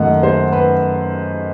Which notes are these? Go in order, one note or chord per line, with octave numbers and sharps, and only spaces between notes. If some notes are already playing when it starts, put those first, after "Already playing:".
Already playing: F#2 D#3 A3 D#5 F#5
C5
B4